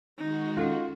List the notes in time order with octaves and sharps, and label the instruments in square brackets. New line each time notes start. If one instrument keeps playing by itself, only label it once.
[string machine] D#3 G#3 F#4 [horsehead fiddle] D#4
[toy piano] C#4 A4 F#5 [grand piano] F4